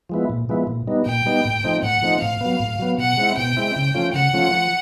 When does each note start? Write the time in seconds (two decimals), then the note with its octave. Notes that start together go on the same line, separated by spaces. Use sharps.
0.10 F3 G#3 B3 E4
0.30 A#2
0.49 F3 G#3 B3 E4
0.67 A#2
0.87 G3 B3 D#4
1.06 A#2 G5
1.26 G3 B3 D#4
1.45 A2
1.64 F3 A3 C4 D#4
1.83 A2 F#5
2.02 F3 A3 C4 D#4
2.21 A2 F5
2.41 F#3 B3
2.60 A2
2.79 F#3 B3
2.98 B2 F#5
3.17 G#3 C4 E4
3.37 B2 G5
3.57 G#3 C4 E4
3.76 C#3
3.94 F3 A3 C#4 F4
4.13 C#3 F#5
4.33 F3 A3 C#4 F4
4.53 F3